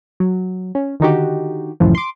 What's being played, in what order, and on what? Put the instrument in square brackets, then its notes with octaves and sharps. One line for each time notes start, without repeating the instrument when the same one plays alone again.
[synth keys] F#3
C#4
D3 D#3 D#4 F#4 G4
C#2 F#2 A2 C#3 E3 F3
C6 D6